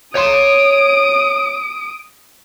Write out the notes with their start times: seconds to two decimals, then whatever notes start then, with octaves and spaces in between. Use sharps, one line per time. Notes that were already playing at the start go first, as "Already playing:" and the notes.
0.15 C#5 C6 D#6 D7